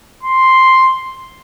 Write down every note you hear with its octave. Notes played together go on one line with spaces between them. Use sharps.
C6